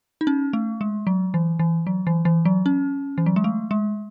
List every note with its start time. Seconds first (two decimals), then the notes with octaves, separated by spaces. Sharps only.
0.21 D#4
0.27 C#4
0.53 A3
0.81 G#3
1.07 F#3
1.34 E3
1.59 E3
1.87 F#3
2.07 E3
2.25 E3
2.45 F#3
2.66 C#4
3.18 E3
3.26 F#3
3.36 G#3
3.44 A3
3.71 G#3